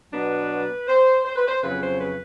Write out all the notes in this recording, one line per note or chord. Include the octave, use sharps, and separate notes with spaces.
B2 F#3 B3 D4 B4
C5
C5
B4
C5
F2 C#3 F#3 B4
C5
B4